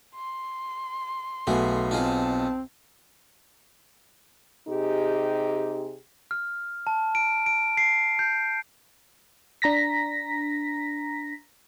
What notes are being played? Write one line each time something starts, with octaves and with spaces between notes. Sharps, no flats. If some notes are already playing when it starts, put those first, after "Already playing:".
C6
B1 A3 B3 F#4 G#4
C4 D#4 F4 G#4 A5
C3 D#4 G4 G#4
F6
A5
D7
D7
C7
G6
D4 A#5 A#6 B6